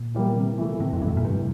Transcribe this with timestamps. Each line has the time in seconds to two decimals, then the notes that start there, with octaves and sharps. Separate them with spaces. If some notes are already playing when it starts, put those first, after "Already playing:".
Already playing: A#2
0.14 E3 G3 A#3
0.35 C3
0.58 E3 A3 E4
0.79 A2 C3
0.93 F2
1.02 G2 E3 A3 E4
1.08 A2
1.17 A#2
1.24 G2 C3